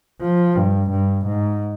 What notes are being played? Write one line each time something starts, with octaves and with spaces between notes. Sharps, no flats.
F3
G2
G2
G#2